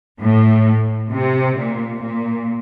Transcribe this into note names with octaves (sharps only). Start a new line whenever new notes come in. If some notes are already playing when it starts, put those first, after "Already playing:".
A2
C3
A#2
A#2